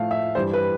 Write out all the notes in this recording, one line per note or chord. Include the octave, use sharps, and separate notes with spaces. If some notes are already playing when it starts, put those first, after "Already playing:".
Already playing: A2 F3 A3 F5
E5
G2 E3 G3 C5
B4